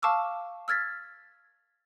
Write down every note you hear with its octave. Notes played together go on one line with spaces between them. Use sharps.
F5 A5 C#6 D6 E6 F6
E6 F6 G#6 A6 B6